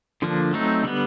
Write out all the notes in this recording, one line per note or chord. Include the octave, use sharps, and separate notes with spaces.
D3 F3 A#3 D4
F#3 A3 C4 D#4
D3 G3 B3